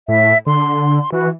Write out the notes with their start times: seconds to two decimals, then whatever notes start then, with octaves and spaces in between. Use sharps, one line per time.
0.08 A2 E5
0.46 D3 C6
1.12 E3 F#4